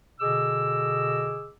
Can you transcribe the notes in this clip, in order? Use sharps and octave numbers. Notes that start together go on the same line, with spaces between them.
B2 D3 G#4 D#5 D6 E6